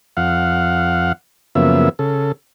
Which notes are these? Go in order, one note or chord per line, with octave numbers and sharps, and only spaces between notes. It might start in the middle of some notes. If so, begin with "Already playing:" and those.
F2 F5 F#5
F#2 C#3 F3 A#3 B3 E5
C#3 A4